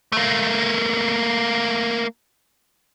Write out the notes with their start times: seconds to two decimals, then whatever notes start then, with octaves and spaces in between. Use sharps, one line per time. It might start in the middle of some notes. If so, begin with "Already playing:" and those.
0.12 A3 A#3